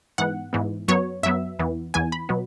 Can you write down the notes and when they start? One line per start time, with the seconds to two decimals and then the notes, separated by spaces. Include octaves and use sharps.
0.18 G#2 E3 B3 F#5
0.53 G#2 E3 B3
0.88 F#2 F#3 B3 C#5
1.23 F#2 F#3 B3 E5
1.59 E2 E3 B3
1.94 E2 E3 B3 G#5
2.12 B5
2.29 B2 F#3 B3